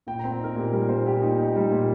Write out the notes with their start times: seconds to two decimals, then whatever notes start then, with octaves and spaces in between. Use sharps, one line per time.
0.07 A#2 G5
0.19 C4 A#5
0.31 G5
0.40 D#4 A#4
0.56 A#2 G4
0.72 G3 A#4
0.89 A#2 C5
1.06 A#2 G4
1.22 D#4
1.38 D#4
1.56 G3
1.72 A#2